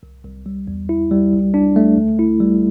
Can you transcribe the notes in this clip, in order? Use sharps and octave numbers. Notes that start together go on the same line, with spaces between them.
C2
C2
G3
E2
E4
G3
C2
D4
A3
D2
E4
G3